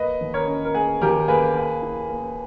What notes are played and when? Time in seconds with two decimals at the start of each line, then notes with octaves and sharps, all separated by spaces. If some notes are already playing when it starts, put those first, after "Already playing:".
Already playing: A#3 B4 D#5
0.21 D#2
0.34 A#4 C#5
0.47 C#4
0.65 A#4
0.74 A#3 G#4
1.01 D#2 G4 A#4
1.28 A#3 G#4 B4
1.55 A#3
1.82 E4
2.09 A#3